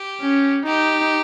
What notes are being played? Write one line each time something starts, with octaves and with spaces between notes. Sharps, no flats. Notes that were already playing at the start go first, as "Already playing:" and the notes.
Already playing: G4
C#4
D#4 G4